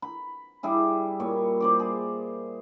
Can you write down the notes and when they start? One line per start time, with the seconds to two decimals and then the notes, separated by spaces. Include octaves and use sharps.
0.02 B5
0.63 G3 E4 G#4
1.20 A#2 C#5
1.61 C5 D5 D6
1.79 G#4